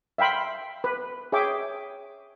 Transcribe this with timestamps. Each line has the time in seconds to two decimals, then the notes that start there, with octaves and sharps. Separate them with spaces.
0.18 E5 F5 G5 B5 C6
0.84 B4
1.32 G#4 C#5 E5 G5 D6